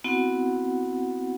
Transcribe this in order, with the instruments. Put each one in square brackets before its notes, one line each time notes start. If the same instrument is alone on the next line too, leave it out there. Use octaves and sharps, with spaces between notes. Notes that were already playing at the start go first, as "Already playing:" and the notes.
[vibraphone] B3 C4 E4 F#4 F#5